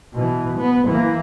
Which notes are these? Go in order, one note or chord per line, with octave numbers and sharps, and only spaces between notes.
B2 E3
B3
E3 A#3